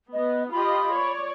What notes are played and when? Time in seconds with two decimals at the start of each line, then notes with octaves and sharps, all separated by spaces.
0.13 B3 D#5
0.52 F4 G4 D#5 B5
0.93 C#5 D5